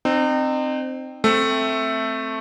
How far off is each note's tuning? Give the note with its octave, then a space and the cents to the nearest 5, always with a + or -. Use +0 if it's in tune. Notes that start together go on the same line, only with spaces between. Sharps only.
C4 +0 D#4 -35
A3 +0 C4 +0 A4 +0